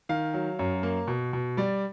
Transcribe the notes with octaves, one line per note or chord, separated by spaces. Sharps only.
D#3 F5
F#3
F#2
A#3
B2
B2
G3 D5